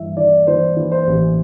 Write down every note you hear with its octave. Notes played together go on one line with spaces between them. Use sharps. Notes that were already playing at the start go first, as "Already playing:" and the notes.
Already playing: G2 E3 E5
E3 D5
E3 C5
E3
C5
A1